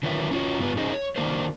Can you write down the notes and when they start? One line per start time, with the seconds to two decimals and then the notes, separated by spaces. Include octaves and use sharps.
0.03 D3 D#3 F4 B4 C#5 E5
0.31 C#4 F4 F#4 C#5
0.59 G2 B3 F4 B4
0.77 C#4 D#4 G#4 C5 D#5
0.92 C#5
1.16 D#3 A#3 D4 A#4 C5